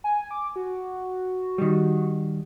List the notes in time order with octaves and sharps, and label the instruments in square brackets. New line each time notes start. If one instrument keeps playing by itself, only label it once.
[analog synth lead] G#5
D6
F#4
[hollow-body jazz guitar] D#3 G3